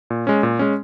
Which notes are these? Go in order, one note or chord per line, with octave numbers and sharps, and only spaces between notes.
A#2
G#3 C#4
A#2
G#3 C#4